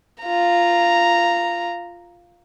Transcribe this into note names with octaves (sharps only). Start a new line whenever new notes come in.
F4 A#5